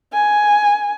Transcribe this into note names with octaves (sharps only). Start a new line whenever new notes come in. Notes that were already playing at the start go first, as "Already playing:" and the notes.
G#5